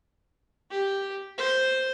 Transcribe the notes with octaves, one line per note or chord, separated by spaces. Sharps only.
G4
C5